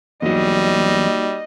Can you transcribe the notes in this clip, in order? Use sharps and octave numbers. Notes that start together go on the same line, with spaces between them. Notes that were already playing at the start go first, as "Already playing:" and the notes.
E2 F#3 G3 A#3 D#4 F#4 D#5